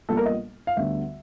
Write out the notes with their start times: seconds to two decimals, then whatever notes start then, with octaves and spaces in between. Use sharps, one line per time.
0.08 A#1 A#2 G3 B3 A4
0.17 A#4
0.26 D#5
0.67 F5
0.77 D2 D3 G3 B3 E5